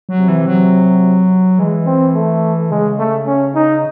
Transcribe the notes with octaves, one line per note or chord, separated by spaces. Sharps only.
F#3
C3
E3
F#3
E3 G#3
C4
A3
C#3 G#3
A3
C#4
D#4